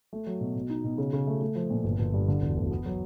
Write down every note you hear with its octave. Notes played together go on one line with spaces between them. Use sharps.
A3
F#3
B2
B2
D#4
B2
C#3
C#3
A3
A3
F3
A#2
G1
G1
G2
D3
E1
D2
B3
F#3